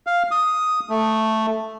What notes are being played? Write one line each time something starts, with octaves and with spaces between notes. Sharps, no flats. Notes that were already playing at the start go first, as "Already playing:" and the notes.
F5
D#6
A3